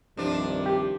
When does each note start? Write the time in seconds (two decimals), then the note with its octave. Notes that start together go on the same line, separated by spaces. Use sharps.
0.17 C2 G2 D#3 F3 D4
0.66 G4